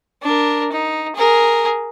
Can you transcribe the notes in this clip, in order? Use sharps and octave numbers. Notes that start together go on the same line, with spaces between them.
D4 A#4
D#4
G#4 A#4